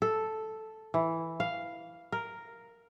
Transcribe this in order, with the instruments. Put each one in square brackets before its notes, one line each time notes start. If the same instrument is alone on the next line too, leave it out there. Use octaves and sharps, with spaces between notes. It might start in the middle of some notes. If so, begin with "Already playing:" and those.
[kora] A4
E3
F5
A#4